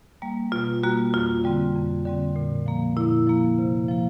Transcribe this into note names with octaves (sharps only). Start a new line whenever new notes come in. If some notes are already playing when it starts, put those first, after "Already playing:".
G3 A#3
B2 F4
G3 A#3 F#4
F2 F4
D3 G3 C4
F2
D3 G3 C4
A#2
F3 A#3
A#2 E4
F3 A#3
C3
F3 A#3